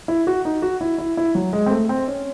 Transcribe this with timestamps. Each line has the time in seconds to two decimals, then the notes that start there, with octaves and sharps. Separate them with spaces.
0.08 E4
0.27 F#4
0.45 D#4
0.62 F#4
0.81 E4
0.98 E4
1.17 E4
1.35 F#3
1.53 G#3
1.66 C4
1.71 A3
1.89 C4
2.08 C#4